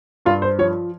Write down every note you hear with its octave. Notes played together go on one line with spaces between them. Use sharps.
G2 F4
C5
F3 C#5